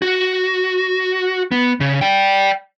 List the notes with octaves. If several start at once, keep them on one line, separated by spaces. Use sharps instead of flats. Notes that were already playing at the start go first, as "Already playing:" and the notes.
F#4
B3
C#3
D5 G5